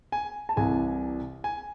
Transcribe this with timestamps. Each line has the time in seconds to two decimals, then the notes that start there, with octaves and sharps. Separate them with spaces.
0.12 G#5
0.49 A5
0.56 C2 C3 E3 G#5
1.44 G#5